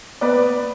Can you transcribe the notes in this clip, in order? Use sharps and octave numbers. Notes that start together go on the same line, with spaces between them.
B3 B4 D5